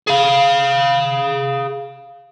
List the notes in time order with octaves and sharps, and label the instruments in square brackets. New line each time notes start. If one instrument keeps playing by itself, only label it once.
[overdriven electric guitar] G#4 F5